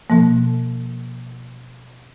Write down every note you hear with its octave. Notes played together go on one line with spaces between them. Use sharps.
B2 F3 A#3